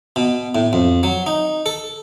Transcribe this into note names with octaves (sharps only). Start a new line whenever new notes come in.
B2
A2
F2
F#3
D#4
A4